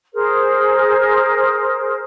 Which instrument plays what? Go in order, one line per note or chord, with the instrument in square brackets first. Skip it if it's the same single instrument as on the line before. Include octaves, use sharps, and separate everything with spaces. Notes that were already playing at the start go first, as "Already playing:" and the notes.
[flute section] G#4 A#4 C5